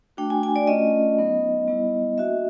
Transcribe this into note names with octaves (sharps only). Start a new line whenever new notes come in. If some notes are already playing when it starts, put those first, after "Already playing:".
A3 D4 F#4 G5
G#5
G#5
D5
A3 C#4 F4 D#5
F#3 B3 D#4
G3 B3 E4
A#3 D4 F#4 E5